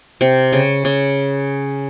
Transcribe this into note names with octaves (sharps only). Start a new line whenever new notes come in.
C3
C#3
C#3